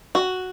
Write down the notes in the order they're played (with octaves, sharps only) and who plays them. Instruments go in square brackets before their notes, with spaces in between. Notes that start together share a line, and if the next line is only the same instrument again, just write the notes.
[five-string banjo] F#4